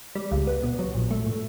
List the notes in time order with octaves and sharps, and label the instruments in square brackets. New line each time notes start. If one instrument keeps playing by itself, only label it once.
[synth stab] G3
C#2
B3
B2
F#3
A#1
A3
A2